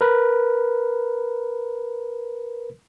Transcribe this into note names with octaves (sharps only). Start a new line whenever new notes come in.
A#4 B4